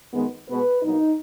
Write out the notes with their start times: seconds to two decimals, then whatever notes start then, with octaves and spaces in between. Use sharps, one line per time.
0.13 F#2 D#3 G#3 B3
0.48 B2 G#3 B3 B4
0.82 B2 F#3 A#3 D#4